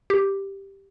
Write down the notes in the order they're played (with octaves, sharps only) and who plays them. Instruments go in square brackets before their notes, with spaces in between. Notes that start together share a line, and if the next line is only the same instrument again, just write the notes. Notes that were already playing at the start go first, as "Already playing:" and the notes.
[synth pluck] G4